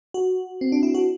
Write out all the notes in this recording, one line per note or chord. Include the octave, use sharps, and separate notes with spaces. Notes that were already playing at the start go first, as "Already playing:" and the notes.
F#4
C4
D4
E4
F#4